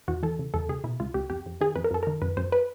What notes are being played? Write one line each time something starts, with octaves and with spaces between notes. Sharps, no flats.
E2 F#4
E3 A4
C#3
E2 A4
C#2 G#4
B2 E4
C#2 F4
C#2 G4
F2 G4
F2
D#3 G#4
F2 B4
A#4
F#2 A4
D#3 A#4
F#2 B4
F#2 C5
B4